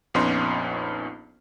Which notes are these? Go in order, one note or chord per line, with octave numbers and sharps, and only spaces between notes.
A#1 F2 B3 C#4 D#4 C6